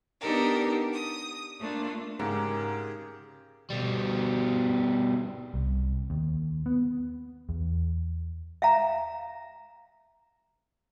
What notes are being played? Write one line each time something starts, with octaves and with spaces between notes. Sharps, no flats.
B3 D4 D#4 G4 A4 A#4
D#6
A3 A#3 D4 F4
G#2 C#3 G4 G#4 A#4
B2 G3
C2
D#2
B3
E2
E5 F5 A#5